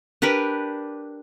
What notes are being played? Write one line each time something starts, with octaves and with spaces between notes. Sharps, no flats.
D4 G4 A#4 B4